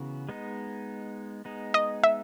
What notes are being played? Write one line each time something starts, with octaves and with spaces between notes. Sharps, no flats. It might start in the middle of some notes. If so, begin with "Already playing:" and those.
Already playing: C#3 E3 B3 F#4 A#4
G#3 B3 D#4
G#3 B3 D#4
D#5
E5